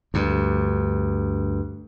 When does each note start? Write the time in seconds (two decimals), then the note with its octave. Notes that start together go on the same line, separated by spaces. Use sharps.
0.14 D2 G2